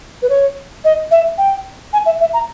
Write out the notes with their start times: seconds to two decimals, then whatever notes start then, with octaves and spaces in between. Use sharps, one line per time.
0.22 B4
0.29 C#5
0.84 D#5
1.11 E5
1.38 G5
1.93 G#5
2.06 E5
2.20 E5
2.33 A#5